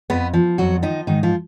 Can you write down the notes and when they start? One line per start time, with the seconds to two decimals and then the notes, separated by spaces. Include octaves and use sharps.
0.10 F2 B3 B4
0.34 F3
0.58 F2 F#3 F#4
0.82 D#3 F3 D#4
1.07 G#2 D#3 D#4
1.23 F3 F4